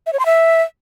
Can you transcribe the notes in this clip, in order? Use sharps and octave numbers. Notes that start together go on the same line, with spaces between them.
E5
C#5
C6
E5